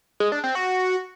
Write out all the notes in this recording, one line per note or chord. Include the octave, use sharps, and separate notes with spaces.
G#3
D4
C4
F#4